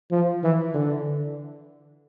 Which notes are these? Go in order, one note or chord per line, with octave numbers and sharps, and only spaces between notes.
F3
E3
D3